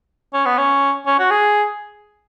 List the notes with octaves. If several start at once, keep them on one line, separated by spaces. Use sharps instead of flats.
C#4
B3
C#4
C#4
F#4
G#4